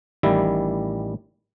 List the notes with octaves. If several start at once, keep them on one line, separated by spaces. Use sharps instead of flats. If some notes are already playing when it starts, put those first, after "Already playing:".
A1 D#3 G3 E4